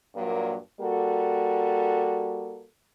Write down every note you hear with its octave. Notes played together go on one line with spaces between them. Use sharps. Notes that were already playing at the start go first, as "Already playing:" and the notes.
G2 A#2 F#3 A#3
G3 A#3 F#4 A4